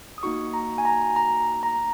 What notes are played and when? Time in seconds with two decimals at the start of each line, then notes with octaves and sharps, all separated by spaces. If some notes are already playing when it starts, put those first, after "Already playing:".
0.18 D#6
0.23 A#3 D#4 F#4 C#6
0.54 A#5
0.78 G#5
0.85 A#5
1.16 A#5
1.63 A#5